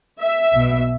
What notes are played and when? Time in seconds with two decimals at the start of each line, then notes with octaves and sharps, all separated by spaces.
0.21 E5
0.53 B1 B2